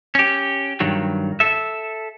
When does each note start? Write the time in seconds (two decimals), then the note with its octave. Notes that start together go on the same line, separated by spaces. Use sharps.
0.15 C#4 G4
0.80 G2 D#3 F#3
1.40 A4 E5